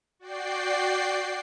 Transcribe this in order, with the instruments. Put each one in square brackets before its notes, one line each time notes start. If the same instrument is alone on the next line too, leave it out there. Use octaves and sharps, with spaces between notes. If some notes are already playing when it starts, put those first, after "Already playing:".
[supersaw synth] F#4 D5 G5 C7